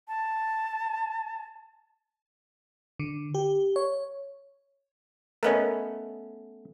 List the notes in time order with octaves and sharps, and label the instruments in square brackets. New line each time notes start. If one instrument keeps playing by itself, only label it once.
[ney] A5
[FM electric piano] D3
G4
C#5
[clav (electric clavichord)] A3 B3 C#4 [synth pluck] A#4 B4 D#5